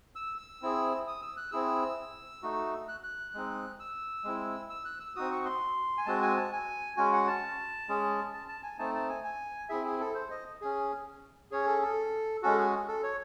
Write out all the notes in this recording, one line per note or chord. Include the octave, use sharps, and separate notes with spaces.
E6
E6
C4 E4 G#4
D#6
E6
F#6
C4 E4 G#4 E6
A3 D#4 F#4
F#6
F#6
G#3 C4 D#4
E6
G#3 C4 E4
E6
F#6
E6
C4 D#4 F#4 D#6
C#6
C6
G#5
G#3 C4 F#4 A5
G#5
A5
G#5
G#3 C#4 F#4 G#5
F#5
A5
G#3 C#4 G#4
A5
A5
G#5
A3 C4 D#4 A5
A5
G#5
G#5
C4 E4 G#4 E5
G#4
A4
C5
D#5
C#4 G#4
C#4 G#4 C#5
A4
A4
G#3 C#4 F#4 A4
G#4
A4
C#5